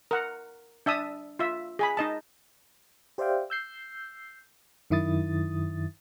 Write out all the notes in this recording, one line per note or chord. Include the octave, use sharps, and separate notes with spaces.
A#4 F#5
D4 E5 A5 D#6
F4 E5
G#4 G#5 B5
D#4 D#5 A5
G4 C5 D5 E5 F5 G5
E6 G6 C7
F#2 D#3 E4 D#6 A6